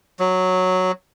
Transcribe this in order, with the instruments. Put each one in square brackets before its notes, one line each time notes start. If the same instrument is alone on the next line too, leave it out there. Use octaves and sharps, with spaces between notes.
[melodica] F#3